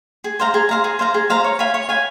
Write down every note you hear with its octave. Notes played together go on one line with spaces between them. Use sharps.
G#4
C5 F5 A#5
G#4
C5 F5 A#5
G#4
C5 F5 A#5
G#4
C5 F5 A#5
C#5
F5 G#5 B5
C#5
F5 G#5 B5